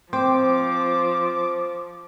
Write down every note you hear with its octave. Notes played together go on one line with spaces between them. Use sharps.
F3 C4 C5 D6